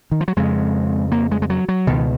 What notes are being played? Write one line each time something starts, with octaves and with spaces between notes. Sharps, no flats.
D#3
F3
F#3
F2 C#3 G#3
A#3
G#3
G#3
F#3
F#3
C#2 B2 D#3